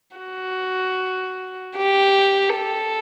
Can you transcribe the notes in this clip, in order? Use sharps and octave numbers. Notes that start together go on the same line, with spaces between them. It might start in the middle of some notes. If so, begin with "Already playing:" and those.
F#4
G4
A4